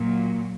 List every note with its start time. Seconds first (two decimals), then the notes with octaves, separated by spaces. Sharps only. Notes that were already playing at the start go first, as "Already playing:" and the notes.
Already playing: A#2 F#3